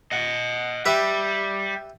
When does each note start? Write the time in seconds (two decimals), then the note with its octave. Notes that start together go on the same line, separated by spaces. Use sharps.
0.12 D#5 F#5
0.86 G3 G4 B4 E5